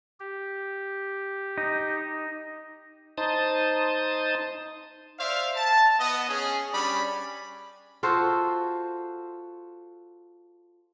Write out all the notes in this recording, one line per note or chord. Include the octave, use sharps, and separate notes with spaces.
G4
D#4
D#4 C5 A5 D#6
C5 D5 E5 F5
A5
B3 D#5
C#4 G#4
G3 C#4 D4 D5 B5
F4 F#4 A4 C5